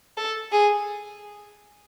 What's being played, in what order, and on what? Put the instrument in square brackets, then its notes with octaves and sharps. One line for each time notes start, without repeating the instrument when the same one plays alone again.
[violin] A4
G#4